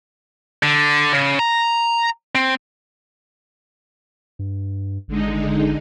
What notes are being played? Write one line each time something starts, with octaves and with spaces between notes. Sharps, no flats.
D3
C#3
A#5
C4
G2
G#1 D3 G#3 D#4